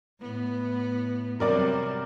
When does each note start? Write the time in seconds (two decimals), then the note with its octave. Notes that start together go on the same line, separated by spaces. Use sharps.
0.21 A2 B3
1.40 C3 F#3 G3 A#4 D5 D6